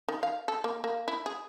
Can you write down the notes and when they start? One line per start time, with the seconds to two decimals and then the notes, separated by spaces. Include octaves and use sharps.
0.08 D#3
0.23 F5
0.48 A4
0.64 A#3
0.84 A#3
1.08 E4
1.26 G#4